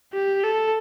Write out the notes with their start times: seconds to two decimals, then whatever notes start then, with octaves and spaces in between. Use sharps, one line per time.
0.13 G4
0.44 A4